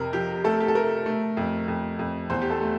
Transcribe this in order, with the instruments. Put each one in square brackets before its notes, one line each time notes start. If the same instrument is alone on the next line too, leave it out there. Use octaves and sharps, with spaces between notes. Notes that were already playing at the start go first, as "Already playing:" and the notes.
Already playing: [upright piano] F2 C3 A#4
F3 G4
A3 A4
G4
A4
A3 A#4
A3
F2
F2
F2
E2 C5
G4
A4
A3